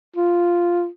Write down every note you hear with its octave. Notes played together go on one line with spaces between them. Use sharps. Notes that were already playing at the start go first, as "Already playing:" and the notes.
F4